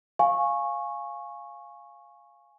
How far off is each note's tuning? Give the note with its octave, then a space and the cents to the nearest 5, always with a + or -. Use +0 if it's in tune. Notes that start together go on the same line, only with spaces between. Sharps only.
F5 +0 G#5 +0 C#6 -15